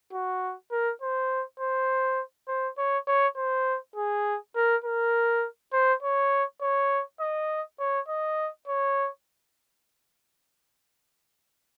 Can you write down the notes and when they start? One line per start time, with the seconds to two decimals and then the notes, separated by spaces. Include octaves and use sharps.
0.13 F#4
0.71 A#4
1.02 C5
1.60 C5
2.48 C5
2.78 C#5
3.07 C#5
3.36 C5
3.96 G#4
4.55 A#4
4.84 A#4
5.73 C5
6.03 C#5
6.61 C#5
7.20 D#5
7.79 C#5
8.08 D#5
8.67 C#5